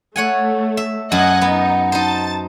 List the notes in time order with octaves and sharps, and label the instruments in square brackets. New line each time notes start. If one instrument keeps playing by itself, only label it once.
[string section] A3 [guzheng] C#5 F#5 G#5
[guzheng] E5
[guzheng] F#2 [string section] D#5 F#5 G#5
[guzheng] B3 [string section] D#4
[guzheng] D#4 C5 [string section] A5 A6